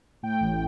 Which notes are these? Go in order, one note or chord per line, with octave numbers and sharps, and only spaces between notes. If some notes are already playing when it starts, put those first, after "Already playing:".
A2 G5
A1